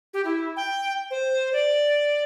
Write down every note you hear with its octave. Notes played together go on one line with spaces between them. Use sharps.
G4
E4
G5
C5
D5